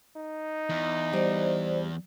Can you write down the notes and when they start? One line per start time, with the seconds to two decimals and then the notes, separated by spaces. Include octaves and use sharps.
0.16 D#4
0.70 E2
1.13 G3 C5 D5